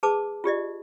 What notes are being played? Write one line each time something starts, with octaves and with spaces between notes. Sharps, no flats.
G#4 B4 A5 D6 E6
F4 G4 D5 D#5